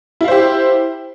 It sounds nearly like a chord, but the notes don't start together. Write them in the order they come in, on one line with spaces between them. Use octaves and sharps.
E4 F5 C5 G4